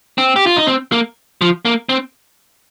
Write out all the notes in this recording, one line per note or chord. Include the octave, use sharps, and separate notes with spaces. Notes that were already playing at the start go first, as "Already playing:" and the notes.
C4
G4
F4
D#4
C4
A#3
F3
A#3
C4